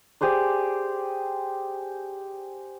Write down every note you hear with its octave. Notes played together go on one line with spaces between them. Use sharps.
G4 G#4 C5 D5